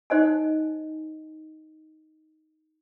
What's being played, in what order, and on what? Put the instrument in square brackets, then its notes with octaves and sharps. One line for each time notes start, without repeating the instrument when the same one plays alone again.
[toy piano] D#4 C5 D#5 G#5